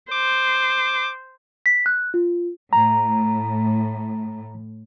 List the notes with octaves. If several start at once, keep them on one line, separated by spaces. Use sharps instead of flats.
C5 D6
B6
F#6
F4
A2 A#5